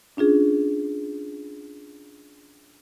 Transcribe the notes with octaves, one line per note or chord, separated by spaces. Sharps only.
C#4 D4 F4 G#4